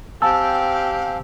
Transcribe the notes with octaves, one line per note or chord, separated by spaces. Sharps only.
C4 G4 F5 G#5 A5 E6